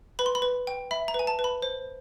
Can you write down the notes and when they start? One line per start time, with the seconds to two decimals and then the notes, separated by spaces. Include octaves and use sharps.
0.19 B4 B5
0.26 C6
0.35 B5
0.42 B4
0.67 G5
0.91 E5 B5
1.08 A#5
1.14 B4 G#5
1.27 A5
1.39 B4
1.44 B5
1.62 C5